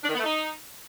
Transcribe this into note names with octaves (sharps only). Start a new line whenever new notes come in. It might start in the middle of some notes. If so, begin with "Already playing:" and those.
D4
D#3
B3
A3
D#4